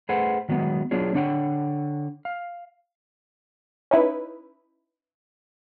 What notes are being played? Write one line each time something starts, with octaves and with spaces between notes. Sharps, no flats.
A3 G#4 B4 C5 F#5
D#3 F#3 G#3 B3
F#3 B3 D4 F4 G#4 C#5
D3 D4 C#5 F#5 G5
F5
C#4 D#4 E4 B4